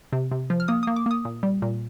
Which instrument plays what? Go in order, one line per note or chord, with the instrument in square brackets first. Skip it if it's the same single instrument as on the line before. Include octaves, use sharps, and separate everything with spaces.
[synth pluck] C3
C3
F3
F6
A#3 D#6
A#3 D#6
D6
A#3 D#6
A#2
G3
A#2